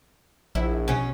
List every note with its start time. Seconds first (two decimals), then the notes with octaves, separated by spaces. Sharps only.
0.55 A#1 E4
0.88 B2 C#4